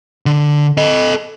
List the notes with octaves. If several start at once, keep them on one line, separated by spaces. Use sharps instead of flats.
D3
A4 D#5